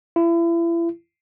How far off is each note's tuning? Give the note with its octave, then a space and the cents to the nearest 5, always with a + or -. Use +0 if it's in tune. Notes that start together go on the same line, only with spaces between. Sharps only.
E4 +35